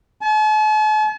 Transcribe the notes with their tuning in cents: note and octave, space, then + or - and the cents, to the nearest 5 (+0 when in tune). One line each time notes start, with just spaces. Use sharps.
A5 -45